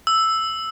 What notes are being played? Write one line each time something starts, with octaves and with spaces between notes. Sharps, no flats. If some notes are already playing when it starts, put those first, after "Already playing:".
E6